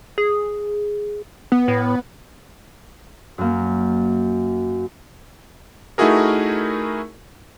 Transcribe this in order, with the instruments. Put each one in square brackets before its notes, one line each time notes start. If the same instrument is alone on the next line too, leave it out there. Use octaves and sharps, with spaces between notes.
[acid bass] G#4
[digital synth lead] B3
[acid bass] A2
[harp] F#2 A#3
[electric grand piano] A3 D#4 E4 F#4 G#4 A#4